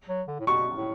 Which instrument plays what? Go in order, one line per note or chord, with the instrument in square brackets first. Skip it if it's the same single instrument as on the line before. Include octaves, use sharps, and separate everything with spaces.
[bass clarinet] F#3
D3
A2
[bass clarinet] B2 [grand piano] C#6
[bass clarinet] A2